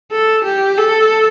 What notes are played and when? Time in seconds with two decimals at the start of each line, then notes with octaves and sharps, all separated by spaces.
0.12 A4
0.45 G4
0.78 A4